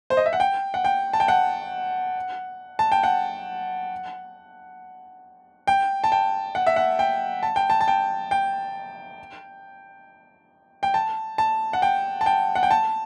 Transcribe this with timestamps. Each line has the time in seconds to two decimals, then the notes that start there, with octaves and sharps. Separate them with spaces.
0.10 C5
0.17 D#5
0.26 E5
0.33 F#5
0.40 G5
0.74 F#5
0.85 G5
1.13 A5
1.20 G5
1.28 F#5
2.79 A5
2.92 G5
3.03 F#5
5.67 G5
6.04 A5
6.12 G5
6.55 F#5
6.67 E5
6.76 F#5
6.99 G5
7.43 A5
7.56 G5
7.70 A5
7.81 A5
7.88 G5
8.31 G5
10.83 G5
10.94 A5
11.38 A5
11.73 F#5
11.82 G5
12.21 A5
12.26 G5
12.55 F#5
12.63 G5
12.71 A5